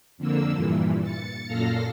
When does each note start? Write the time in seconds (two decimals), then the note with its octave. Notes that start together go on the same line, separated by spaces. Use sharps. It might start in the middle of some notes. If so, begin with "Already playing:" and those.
0.18 F2 D3 A#3 E6
0.52 G2 A#2 E3
1.03 A6 C#7
1.47 F#2 A#2 A4 F5 F6 A#6